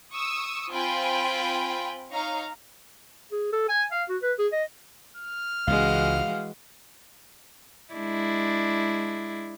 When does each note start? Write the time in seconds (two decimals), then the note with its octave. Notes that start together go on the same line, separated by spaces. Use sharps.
0.12 C#6 D#6 E6
0.72 C4 F4 G5 G#5 B5
2.12 D#4 C#5 F5 A#5
3.32 G#4
3.53 A4
3.69 G#5
3.91 F5
4.09 F#4
4.22 B4
4.38 G#4
4.52 D#5
5.17 F6
5.67 C#2 E3 G#3 F#4 F5
7.94 G#3 D4 E4